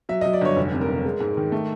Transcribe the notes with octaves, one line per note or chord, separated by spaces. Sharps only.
F#3 E5
F#3 D#5
D5
G1 C#5
F1
C3
A#4
F1
G#3
G#2
D#3
A3